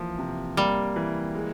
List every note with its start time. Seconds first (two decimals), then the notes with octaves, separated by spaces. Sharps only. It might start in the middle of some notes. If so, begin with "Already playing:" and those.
Already playing: E3 F3 A#3
0.19 C3
0.57 G3 A#3
0.96 E3
1.35 G#3